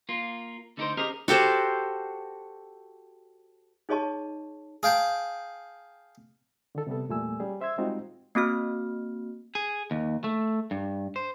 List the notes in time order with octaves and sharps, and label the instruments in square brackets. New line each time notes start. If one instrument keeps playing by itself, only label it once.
[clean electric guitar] A#3 F4
D3 A3 D#4 G#4 A#4 C5
C#4 G4 G#4 A#4 C5 D#5
[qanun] F#4 G4 A4 C5
[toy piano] D#4 G#4 C#5 D#5 A5 C#6
[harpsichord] G#4 F5 G5 A5
[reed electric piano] D3 D#3 A4
C3 G3 B3 A4
E2 A#2 G3 A3 G#5 E6
G3 C#4 G#4
C5 E5 C6 E6 G#6
G3 G#3 C4 D#4 F4 F#4
[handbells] A#3 C4 F#4 F6
[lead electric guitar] G#4
D#2
A3
G2
C5